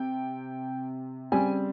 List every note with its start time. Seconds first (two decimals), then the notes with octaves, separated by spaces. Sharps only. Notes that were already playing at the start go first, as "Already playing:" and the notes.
Already playing: C3 G5
1.32 C#3 G3 C4 G#5